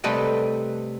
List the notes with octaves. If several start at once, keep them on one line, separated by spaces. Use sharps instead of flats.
C3 G3 A3 B4 D#5 G5